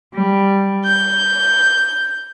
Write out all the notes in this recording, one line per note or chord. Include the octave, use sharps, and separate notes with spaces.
G3
G6